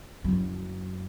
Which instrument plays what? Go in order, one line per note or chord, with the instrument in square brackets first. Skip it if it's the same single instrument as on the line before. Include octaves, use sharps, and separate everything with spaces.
[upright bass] F#1 F#3